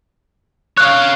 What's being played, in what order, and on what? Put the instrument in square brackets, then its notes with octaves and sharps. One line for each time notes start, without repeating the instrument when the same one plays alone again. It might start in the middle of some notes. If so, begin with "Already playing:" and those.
[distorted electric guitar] C#5 F5 [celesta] F#6